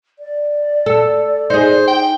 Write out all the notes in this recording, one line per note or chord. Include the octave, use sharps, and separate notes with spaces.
D5
A4
D#4 G#4 C5
G5